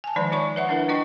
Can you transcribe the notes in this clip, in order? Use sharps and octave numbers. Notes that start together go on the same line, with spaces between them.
G#5 A5
D#3 F3 G#3 D#4 C5 D5
F4 C#5 C#6
B4 E5 F#5
D4 E4 A#4 B4
D4 F4 D#5 G5 C#6